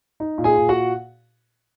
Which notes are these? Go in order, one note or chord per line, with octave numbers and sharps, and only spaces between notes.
D#4
A#2
G#4 G#5
A#2
F#4 F#5